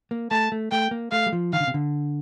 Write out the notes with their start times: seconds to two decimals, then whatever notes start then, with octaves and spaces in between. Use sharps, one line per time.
0.11 A#3
0.31 A3 A5
0.52 A3
0.71 A3 G5
0.91 A#3
1.12 A3 F5
1.26 G3
1.32 F3
1.53 D#3 F5
1.60 D3
1.67 C3
1.74 D3